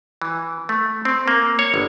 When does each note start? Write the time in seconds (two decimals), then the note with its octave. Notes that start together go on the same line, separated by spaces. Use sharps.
0.22 E3
0.69 A3
1.05 C4
1.28 A#3
1.59 C#5
1.74 G1